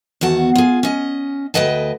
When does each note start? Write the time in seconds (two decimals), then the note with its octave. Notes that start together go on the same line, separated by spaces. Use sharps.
0.21 E2 D#3 F#4 A5
0.55 F4 G#4
0.83 C#4 D#5
1.54 D2 G#2 B4 D#5 G5 A5